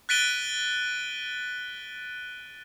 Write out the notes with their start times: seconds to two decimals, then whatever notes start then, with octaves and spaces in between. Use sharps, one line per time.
0.09 F#6 A6 B6 D7 D#7 G7